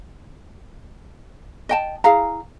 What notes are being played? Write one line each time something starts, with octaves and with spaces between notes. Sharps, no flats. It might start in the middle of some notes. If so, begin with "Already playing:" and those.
D#5 G5 A5
E4 G#4 F5 A#5